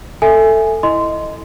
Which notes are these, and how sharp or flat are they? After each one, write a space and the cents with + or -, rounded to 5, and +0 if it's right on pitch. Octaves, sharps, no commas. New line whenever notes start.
A4 +10 E5 +0 G#5 +0
E4 +0 D#5 +0 C6 -15